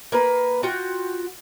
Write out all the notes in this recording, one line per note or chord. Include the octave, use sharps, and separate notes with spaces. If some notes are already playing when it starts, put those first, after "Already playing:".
A#3 B4
F4 F#4 F#5 G5